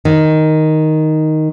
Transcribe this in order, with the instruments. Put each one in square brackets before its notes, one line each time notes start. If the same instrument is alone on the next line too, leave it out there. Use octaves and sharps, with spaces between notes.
[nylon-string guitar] D#3